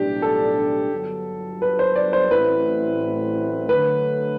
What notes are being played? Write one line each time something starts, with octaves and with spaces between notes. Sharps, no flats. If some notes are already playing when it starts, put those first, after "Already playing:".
Already playing: B1 A2 E3 G3 D4 G4
A4
G1 G2 F#3 B3
B4
C5
D5
C5
A1 A2 F#3 C4 E4 B4
D2 D3 F#3 A3 B4